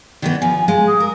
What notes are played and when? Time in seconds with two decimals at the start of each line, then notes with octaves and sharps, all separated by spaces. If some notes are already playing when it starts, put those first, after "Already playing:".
0.22 D#3 E3 B3
0.42 F3 G#5
0.68 G#3 F5
0.87 D#6
1.00 A#4